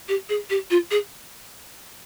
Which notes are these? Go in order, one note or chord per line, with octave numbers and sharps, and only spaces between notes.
G4
G#4
G4
F4
G#4